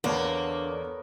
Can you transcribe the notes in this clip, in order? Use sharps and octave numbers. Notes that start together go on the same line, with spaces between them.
E2 D3 A#3 B3 C#5 A5